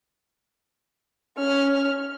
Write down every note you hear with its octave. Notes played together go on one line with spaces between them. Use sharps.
C#4 F6